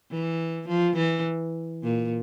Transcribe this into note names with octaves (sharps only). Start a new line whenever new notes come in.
E3
F3
E3
A#2